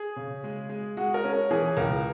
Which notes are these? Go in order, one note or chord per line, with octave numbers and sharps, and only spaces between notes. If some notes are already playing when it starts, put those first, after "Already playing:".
Already playing: G#4
C#3
G#3
G#3
G#3 F#4
A#4
C#4
A#4
E3 G#4
C#2 A#4